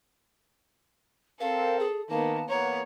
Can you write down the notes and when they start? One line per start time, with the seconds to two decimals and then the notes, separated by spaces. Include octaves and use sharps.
1.40 C4 A4 A#4 F5
1.80 G#4
2.10 D#3 A#3 B3 A5
2.49 E2 A#3 B3 C#5 A#5